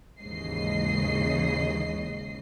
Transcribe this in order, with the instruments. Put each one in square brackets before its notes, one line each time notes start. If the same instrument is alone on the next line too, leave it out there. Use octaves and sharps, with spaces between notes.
[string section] D#2 G#2 C#3 E3 D#5 C7